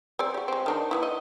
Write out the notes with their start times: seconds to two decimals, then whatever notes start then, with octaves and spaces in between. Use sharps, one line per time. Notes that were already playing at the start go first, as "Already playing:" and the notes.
0.19 C4 G#4 D5
0.34 F#4 G4
0.48 G#3 C4
0.66 D#3 D4 D#4
0.91 B3 D#4 E4
1.03 D#5